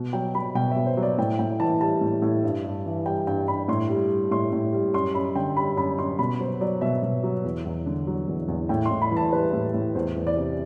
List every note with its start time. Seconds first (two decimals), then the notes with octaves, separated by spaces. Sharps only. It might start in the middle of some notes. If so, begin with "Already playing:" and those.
Already playing: B2
0.13 F#3 G5
0.35 F#3 B5
0.55 B2 G5
0.71 B2 E5
0.86 C5
0.97 F#3
1.03 D5
1.18 A2 G5
1.39 A2 G5
1.60 E3 A5
1.80 G3 A5
2.01 A2
2.22 A2
2.44 G2
2.64 G2
2.86 E3
3.06 G3 G5
3.27 G2 G5
3.48 G2 B5
3.68 A2 C6
3.89 G3
4.10 G3
4.31 A2 C6
4.53 A2
4.73 G3
4.94 F#2 C6
5.14 F#2 B5
5.35 D3 G5
5.57 G3 B5
5.77 F#2 B5
5.98 F#2 C6
6.19 B2 B5
6.40 F#3 C5
6.61 F#3 D5
6.81 B2 E5
7.03 B2
7.23 F#3
7.44 E2
7.65 E2
7.86 D3
8.07 F#3
8.28 E2
8.48 E2
8.69 A2 G5
8.85 C6
8.91 A2
9.02 B5
9.11 E3
9.17 A5
9.33 G3 B4
9.53 A2
9.74 A2
9.95 E2 C5
10.16 E2
10.27 D5
10.37 C3